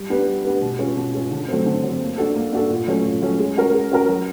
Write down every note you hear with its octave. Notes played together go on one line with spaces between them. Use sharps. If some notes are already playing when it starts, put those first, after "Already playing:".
Already playing: G3
B3 D4 G4 B4
G3
B3 D4 G4 B4
B2
G#3 C#4 F4
B2
G#3 C#4 F4
D3
F#3 A3 C4
D3
F#3 A3 C4
A#3
D4 F#4 A4
A#3
D4 F#4 A4
A#2
F#3 A3 C#4
A#2
F#3 A3 C#4
G#3
C#4 F#4 A#4
G#3
C#4 F#4 A#4
F#3